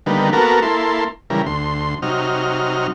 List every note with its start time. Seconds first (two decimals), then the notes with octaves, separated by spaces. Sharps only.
0.06 D3 D#3 G3 A#3 B3
0.33 A#3 B3 F#4 A4 A#4
0.62 A#3 E4 A4 C6
1.30 C#3 E3 G3 A#4
1.46 D2 C6
2.02 C3 F#3 D#4 F6